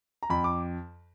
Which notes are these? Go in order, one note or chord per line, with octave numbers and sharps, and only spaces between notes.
A#5
F2 B5
D6